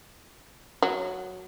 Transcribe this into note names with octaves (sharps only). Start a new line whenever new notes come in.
F#3